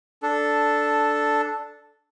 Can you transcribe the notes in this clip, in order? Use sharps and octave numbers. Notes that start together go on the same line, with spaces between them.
D4 A4